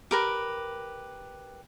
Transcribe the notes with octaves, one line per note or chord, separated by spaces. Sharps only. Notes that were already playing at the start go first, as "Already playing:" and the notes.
G4 A#4 B4